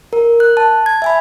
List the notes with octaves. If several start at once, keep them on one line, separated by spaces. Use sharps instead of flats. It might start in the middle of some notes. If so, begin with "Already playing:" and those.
A#4
F#6
A5
G#6
E5 G#5 B5